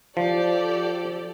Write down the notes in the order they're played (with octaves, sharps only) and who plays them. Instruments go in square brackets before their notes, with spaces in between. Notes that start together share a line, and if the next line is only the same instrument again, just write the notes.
[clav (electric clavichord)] F3 [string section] G4 A4 D5